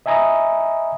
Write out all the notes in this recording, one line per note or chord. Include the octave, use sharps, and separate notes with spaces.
D#5 E5 G#5 A#5 B5 D#6